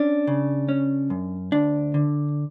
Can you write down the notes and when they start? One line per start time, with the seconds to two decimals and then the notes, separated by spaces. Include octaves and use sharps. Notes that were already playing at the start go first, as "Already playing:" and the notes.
Already playing: C#4 D4
0.27 C#3
0.69 C#4
1.10 F#2
1.52 D2 D4
1.94 D3